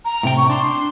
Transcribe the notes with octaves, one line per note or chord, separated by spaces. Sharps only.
A#5
A2 C3 G5
C#6
D4 C6